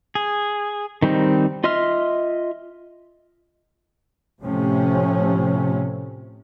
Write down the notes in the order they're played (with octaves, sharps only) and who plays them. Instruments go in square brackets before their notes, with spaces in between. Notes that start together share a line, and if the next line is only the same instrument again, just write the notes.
[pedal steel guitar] G#4
D#3 G3 C4 D#4
F4 D#5 E5 C6 F6
[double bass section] A2 C3 F3 A3 C#4